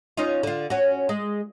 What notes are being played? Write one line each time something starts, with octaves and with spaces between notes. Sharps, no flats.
C#4 D#4 F4
D3 F4
C#4 F#4
G#3